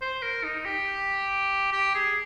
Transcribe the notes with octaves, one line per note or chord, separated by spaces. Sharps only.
C5
A#4
D#4
G4
G4
G#4